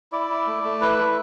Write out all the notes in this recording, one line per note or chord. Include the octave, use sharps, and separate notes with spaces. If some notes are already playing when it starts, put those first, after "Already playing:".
E4 D5
E4
A3
A3
E4 B4
E4